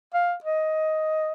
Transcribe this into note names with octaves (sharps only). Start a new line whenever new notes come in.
F5
D#5